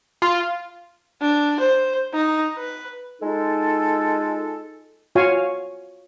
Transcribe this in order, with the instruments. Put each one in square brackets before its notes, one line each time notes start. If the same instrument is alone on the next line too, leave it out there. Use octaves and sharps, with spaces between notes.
[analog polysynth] F4
[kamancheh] D4
C5
D#4
B4
[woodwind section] G#3 D#4 F4 A4
[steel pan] F4 F#4 C#5 F5 G#5